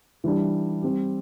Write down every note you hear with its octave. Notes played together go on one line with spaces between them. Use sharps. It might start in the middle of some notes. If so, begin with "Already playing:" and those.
E3 G3 D4
G3 C4 G4